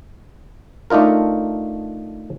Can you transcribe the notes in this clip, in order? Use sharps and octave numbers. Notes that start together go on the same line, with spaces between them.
A3 D4 D#4 F4 A#4